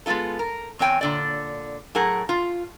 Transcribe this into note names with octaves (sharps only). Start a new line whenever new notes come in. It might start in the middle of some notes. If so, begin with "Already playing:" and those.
G#3 B3 C4 F4 A4
A#4
E2 C4 C#5 G5 G#5
A#2 D3 D5
A2 F#3 G#4 A#4 F#5
F4